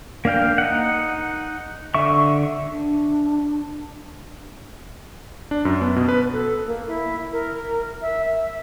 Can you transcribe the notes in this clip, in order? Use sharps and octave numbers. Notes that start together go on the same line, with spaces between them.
A#3 D4 F5 G5
D#4 F#5
D3 E5 C#6
D4
D4
F#2
B3
B2
B4
A4
A#3
E4
A#4
E5
E5